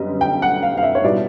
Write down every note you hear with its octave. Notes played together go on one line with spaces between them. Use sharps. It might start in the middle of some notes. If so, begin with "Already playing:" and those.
Already playing: F#2 D3 G3 B3 D#5
G5
F#5
F5
F5
E5
C#5
B2 G3 B3 E4 D5